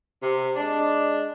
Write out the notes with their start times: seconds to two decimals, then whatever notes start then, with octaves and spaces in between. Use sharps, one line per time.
0.23 C3
0.56 G#3 D4